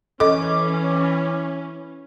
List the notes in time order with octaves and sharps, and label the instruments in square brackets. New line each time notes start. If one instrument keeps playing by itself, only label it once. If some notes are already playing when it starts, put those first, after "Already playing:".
[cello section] E3 [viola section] C#4 [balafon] A4 D#5 [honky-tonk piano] D6